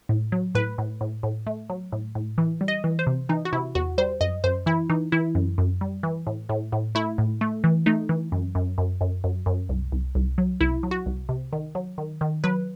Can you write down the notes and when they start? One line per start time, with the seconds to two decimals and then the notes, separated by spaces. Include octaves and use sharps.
0.09 A2
0.32 F#3
0.55 A2 B4
0.78 A2
1.01 A2
1.23 A2
1.47 A3
1.70 F#3
1.92 A2
2.15 A2
2.38 E3
2.61 G3
2.68 D#5
2.84 E3
2.99 C5
3.07 C3
3.29 E3 D#4
3.45 F#4
3.53 C3 E4
3.75 E2 F#4
3.98 G3 C5
4.21 F#2 D#5
4.44 F#2 C5
4.66 E3 E4
4.90 E3 D#4
5.12 E3 E4
5.35 F#2
5.58 F#2
5.81 G3
6.03 E3
6.27 A2
6.49 A2
6.72 A2
6.95 A3 E4
7.18 A2
7.41 A3
7.64 E3
7.86 A3 D#4
8.09 E3
8.32 F#2
8.55 F#2
8.78 F#2
9.01 F#2
9.24 F#2
9.46 F#2
9.69 C2
9.92 C2
10.15 C2
10.38 F#3
10.61 C2 E4
10.83 F#3
10.91 F#4
11.06 C2
11.29 C3
11.53 D#3
11.75 F#3
11.98 D#3
12.21 D#3
12.44 F#3 B4